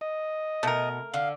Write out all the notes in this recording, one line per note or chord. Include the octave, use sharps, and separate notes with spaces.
D#5
B2 A3 A#4
D3 F5